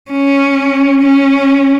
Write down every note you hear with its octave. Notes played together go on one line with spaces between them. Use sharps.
C#4
C#4